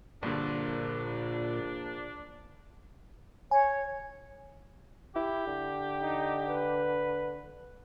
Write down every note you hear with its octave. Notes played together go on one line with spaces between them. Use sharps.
A#1 G2 A#2 D3 D4
C#5 G#5
E4 G4
D3
D#4
B4